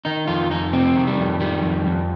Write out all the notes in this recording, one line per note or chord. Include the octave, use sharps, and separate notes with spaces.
D#3 D#4
F2 F4
F2 D#4
C3 C4
D#3
G3
F2
D#3 G3
F2
F2